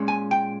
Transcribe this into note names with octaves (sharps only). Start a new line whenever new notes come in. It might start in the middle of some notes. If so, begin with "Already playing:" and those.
Already playing: A#2 G#3 C#4
G#5
G5